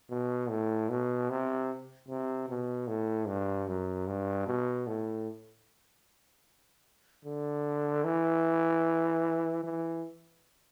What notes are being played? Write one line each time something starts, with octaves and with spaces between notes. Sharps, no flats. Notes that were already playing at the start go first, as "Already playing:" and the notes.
B2
A2
B2
C3
C3
B2
A2
G2
F#2
G2
B2
A2
D3
E3
E3